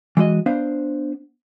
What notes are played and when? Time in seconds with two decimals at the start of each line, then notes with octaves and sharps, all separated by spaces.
0.17 E3 G#3 F#4 D#5
0.46 B3 D4 C5 F5